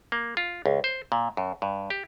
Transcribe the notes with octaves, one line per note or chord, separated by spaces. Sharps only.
A#3
F4
C#2
C5
A#2
F#2
G2
G4